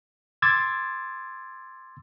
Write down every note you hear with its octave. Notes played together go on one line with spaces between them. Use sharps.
C6 D6 E6 G#6 A6